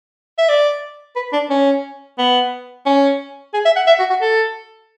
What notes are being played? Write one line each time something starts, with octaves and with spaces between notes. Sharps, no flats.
E5
D5
B4
D4
C#4
B3
C#4
G#4
E5
F#5
E5
F#4
F#4
A4